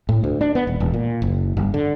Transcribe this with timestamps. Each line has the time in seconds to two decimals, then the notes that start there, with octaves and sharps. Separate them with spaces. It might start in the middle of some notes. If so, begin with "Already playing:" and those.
0.09 A2
0.24 D2
0.41 D4
0.55 B3
0.67 D#1
0.80 E1
0.94 A#2
1.22 F#1
1.57 G1
1.74 D3